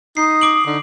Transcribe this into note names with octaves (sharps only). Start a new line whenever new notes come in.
D#4 D#6 C7
D6 D7 F#7
D3 D#4